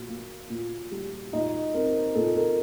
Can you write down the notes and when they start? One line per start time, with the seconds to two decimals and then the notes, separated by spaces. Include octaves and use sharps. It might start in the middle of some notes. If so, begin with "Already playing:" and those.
Already playing: A#2 F#4
0.09 A#3
0.50 A#2
0.92 G3
1.33 A#2 D#4 D#5
1.74 C4 A#4
2.15 A#2 A4
2.35 A#4